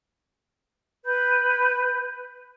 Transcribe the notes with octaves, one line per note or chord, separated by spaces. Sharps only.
B4 B5 G6